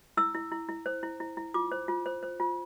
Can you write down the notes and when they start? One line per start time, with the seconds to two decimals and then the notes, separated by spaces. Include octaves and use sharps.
0.17 E4 E6
0.35 E4
0.51 E4
0.69 E4
0.86 C5
1.03 E4
1.20 E4
1.37 E4
1.54 F4 D6
1.72 C5
1.88 F4
2.06 C5
2.23 C5
2.40 F4